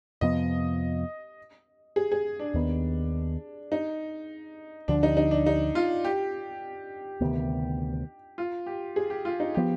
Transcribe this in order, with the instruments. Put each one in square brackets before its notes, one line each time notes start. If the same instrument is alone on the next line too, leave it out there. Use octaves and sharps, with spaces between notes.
[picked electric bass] F2 C3 F3 B3 [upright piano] D#5
[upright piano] G#4
G#4
D4
[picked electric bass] D#2 D#3 B3
[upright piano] D#4
[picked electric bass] D2 D3 F3 [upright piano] D4
[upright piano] D#4
D#4
D4
D#4
F4
G4
[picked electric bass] D2 C3 D#3 B3
[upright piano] F4
G4
G#4
G4
F4
D#4
[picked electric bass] F3 B3 [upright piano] G4